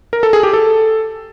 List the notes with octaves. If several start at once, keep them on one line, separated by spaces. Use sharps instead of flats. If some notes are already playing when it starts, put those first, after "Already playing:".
A#4
A4
G#4
G4
A4